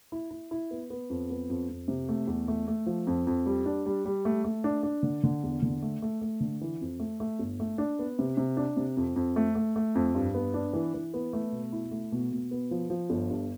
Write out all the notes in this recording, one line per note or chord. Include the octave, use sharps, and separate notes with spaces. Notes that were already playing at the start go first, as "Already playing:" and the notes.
E4
E4
E4
B3
B3
F2
B3
F2
F2
C3
A3
E2
A3
A3
F3
F2
F2
G3
D4
G3
G3
A3
A3
D4
D4
D3
D3
E2
D3
A3
A3
A3
D3
E3
F2
A3
A3
G1
A3
D4
B3
C3
C3
D4
C3
F2
F2
A3
A3
A3
F2
G2
B3
D4
E3
E3
B3
A3
B2
E4
A3
B2
B2
B3
F3
F3
G1
G2